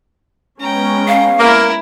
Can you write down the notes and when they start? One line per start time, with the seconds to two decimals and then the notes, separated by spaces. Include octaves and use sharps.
0.60 G#3 B3 C#4 G5 A#5
1.08 F5
1.39 A#3 E4 A#4